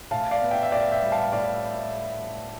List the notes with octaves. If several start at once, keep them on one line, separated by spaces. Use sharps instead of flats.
A2 F5 A5
D5 F5
B3
E5 G5
E5
A2 D5 F5
E5 G5
G3
F5 A5
A2 D5 F5